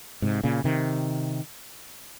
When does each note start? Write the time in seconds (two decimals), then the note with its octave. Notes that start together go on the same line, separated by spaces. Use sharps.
0.22 G#2 C3
0.44 A#2 C#3
0.64 C3 D#3